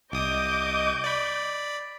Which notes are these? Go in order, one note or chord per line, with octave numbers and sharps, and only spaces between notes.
C2 D#5 D6 D#6 G6
D5 B5